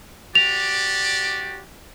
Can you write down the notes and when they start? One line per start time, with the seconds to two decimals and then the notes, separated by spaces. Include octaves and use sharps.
0.35 F#4 G4 D5 F7